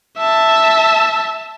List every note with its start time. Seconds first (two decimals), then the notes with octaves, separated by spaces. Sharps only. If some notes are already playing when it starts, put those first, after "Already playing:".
0.18 E5 A5